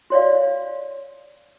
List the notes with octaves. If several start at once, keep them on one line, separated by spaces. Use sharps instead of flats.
F#4 C#5 D5 F5